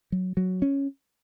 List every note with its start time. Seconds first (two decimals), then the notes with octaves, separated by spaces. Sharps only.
0.12 F#3
0.37 F#3
0.62 C#4